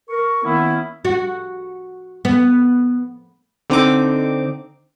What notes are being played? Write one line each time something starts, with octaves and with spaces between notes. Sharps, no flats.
A#4 C#6
D#3 A#3 B3 C#4 E4
F#4
B3
D3 C4 D#4 D6